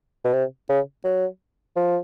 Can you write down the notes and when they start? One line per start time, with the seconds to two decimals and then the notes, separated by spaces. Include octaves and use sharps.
0.25 B2
0.33 C3
0.69 C#3
1.04 F#3
1.76 F3